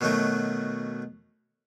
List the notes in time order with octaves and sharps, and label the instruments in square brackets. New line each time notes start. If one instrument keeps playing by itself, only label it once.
[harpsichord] B2 D#3 F#3 A3 F#4